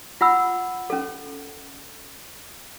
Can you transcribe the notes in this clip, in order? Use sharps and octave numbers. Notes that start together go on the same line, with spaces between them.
F4 F#5 B5 E6
C#4 A4